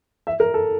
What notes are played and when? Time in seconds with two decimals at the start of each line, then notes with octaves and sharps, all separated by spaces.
0.27 E5
0.40 A#4
0.54 A4